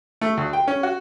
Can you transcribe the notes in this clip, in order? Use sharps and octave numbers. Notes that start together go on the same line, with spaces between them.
A3
D2
G5
C#4
F#4